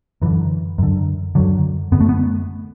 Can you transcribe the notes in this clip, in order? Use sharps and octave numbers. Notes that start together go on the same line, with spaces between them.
F#2 D3 E3
F#2 D3
F#2 D3 F#3
F#2 D3 B3
A3
B3